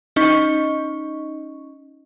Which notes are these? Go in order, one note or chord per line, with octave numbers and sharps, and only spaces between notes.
C#4 D#4 D#5 C#6